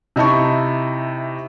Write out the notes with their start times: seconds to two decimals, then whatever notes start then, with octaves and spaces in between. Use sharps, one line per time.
0.16 C3 D#4 E4 A5 C#6